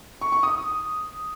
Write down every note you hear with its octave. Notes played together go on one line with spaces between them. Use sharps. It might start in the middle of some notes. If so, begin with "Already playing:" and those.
C#6
C#6
D#6